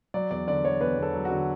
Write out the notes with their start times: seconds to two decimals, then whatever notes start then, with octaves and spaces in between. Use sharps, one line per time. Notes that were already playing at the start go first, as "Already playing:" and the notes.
0.14 F#3 D5
0.31 E2 D5
0.47 D3 D5
0.65 F#3 C#5
0.81 E2 B4
0.98 E2 A4
1.14 F#3
1.25 F#4
1.30 D3